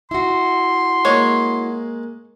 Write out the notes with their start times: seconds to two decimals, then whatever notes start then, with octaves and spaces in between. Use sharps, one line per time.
0.11 E4 F#4 C6
1.05 G#3 A#3 C#5